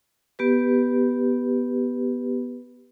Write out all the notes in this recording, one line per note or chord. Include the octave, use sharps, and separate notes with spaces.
B3 G4 B4